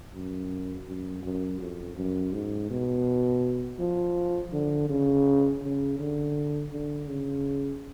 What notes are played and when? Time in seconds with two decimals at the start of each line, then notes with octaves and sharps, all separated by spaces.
0.14 F#2
0.87 F#2
1.23 F#2
1.60 F2
1.97 F#2
2.33 G#2
2.70 B2
3.79 F3
4.53 D3
4.89 C#3
5.62 C#3
5.99 D3
6.72 D3
7.08 C#3